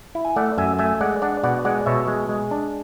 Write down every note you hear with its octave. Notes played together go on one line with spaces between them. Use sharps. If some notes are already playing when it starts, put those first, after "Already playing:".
E4
G#5
A3 D5 F#5
F#2 E5 G#5
A3 E5 G#5
G#3 D5 F#5
D4 D5 F#5
B2 D5 F#5
G#3 D5 F#5
B2 C#5 E5
G#3
G#3
D4